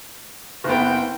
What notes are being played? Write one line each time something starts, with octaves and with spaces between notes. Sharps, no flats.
F#1 B3 C4 D#4 G5